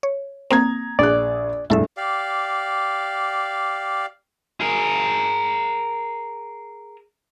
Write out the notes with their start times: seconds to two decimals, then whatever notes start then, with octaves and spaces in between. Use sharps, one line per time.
0.03 C#5
0.51 A#3 C4 A#5 D#6 G#6
0.99 A#1 G#4 D5 F#6
1.70 F1 A#1 G2 E4 A4 E5
1.97 G4 D5 F5
4.61 G#4 A#4